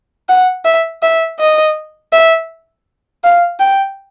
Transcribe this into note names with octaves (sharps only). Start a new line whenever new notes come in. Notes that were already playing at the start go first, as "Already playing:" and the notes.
F#5
E5
E5
D#5
E5
F5
G5